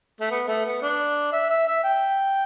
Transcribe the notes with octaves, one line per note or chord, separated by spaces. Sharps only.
A3
B3
A3
B3
D4
E5
E5
E5
G5